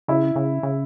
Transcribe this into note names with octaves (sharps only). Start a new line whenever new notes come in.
C#3 E4
C#3
C#3